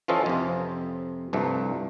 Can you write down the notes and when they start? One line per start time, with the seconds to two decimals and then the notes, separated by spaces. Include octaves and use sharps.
0.08 E3 F3 C#4 F4 A4 D#5
0.26 F2 C3
1.33 C2 G2 F3 A3